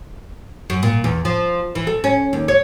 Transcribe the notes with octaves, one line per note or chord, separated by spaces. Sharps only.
F#2
A#2
E2
F3
E3
A3
C#4
D#2
C#5